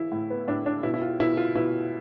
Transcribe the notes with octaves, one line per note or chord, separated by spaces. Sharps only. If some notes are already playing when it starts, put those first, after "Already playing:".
Already playing: E3 E4
A2
B3
A2 D4
D4
B2 E4
E4
F4
B2 E4
F4
B2 E4